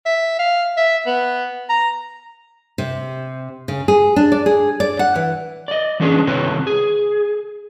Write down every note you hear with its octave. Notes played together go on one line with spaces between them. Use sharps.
E5
F5
E5
B3
A#5
C3
C#3
G#4
D4
D5
G#4
D5
F#5
E3
D5 D#5
E3 A3 C#4 D4 G#4 B4
C3 D#3 C4 E4 B4 C#5
G#4